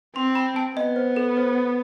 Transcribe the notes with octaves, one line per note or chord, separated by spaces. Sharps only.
C4 C6
B5
A5
B3 D#5
C5
A4
C5